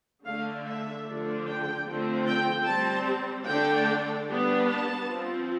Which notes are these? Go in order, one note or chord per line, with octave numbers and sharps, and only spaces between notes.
D3 A3 D4 F5
E5
D3 F3 A3 D4
G5
D3 F3 A3 C4
G5
G3 C4 A5
D3 A3 D4 G5
G3 B3 D4
A5
F3 C4